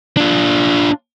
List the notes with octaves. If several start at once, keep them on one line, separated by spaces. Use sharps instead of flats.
D4 F4